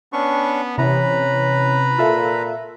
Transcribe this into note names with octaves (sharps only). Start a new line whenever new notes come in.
B3 C#4 D4 C#6
C3 E3 C#4 B4 A#5 B5
A#2 F4 A4 E5